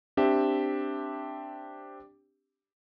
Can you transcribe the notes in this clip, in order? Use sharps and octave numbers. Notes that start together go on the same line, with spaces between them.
C4 D4 G4 E5